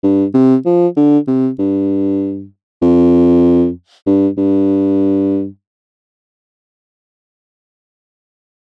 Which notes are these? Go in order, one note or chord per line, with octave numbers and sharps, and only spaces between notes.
G2
C3
F3
D3
C3
G2
F2
G2
G2